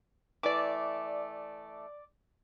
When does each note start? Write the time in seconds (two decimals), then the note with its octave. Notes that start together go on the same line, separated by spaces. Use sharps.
0.43 E3 A3 D5 D6